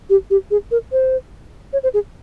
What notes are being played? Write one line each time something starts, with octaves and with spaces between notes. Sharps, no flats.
G4
G4
G#4
A#4
C5
C#5
C5
G#4